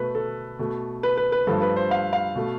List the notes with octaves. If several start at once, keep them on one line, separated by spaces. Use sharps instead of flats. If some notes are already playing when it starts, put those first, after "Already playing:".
Already playing: B2 A3 B4
A4
B2 A3
B4
B4
B4
G2 F3 A3 A4
B4
C5
F5
F5
B2 A3